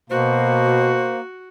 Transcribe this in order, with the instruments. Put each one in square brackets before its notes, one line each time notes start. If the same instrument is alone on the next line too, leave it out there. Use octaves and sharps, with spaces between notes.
[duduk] B2 [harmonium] A#3 [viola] F#4 [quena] C5